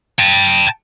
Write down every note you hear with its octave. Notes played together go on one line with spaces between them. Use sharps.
G5 A5